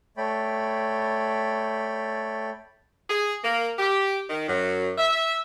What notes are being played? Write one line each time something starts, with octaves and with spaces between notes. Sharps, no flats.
A3 C#5 D5 G5 B5
G#4
A#3
G4
D#3
F#2
E5